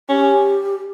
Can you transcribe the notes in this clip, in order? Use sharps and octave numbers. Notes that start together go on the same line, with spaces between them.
C#4 G4